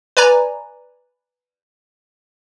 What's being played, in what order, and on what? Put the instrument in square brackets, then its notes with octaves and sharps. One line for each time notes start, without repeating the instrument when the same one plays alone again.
[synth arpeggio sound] B4 D5 G#5 A#5